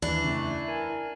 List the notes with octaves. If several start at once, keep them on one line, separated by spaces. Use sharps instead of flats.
D#2 E3 D4
F2 C#3 A3
A#4 G#5